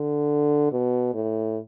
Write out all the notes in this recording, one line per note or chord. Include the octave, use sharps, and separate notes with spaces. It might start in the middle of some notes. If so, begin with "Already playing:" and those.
Already playing: D3
B2
A2